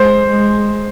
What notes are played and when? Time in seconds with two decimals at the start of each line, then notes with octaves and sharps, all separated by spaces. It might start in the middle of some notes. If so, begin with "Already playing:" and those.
Already playing: G#3 C5
0.31 G#3